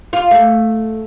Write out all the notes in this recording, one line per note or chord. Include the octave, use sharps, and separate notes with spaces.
F4
A3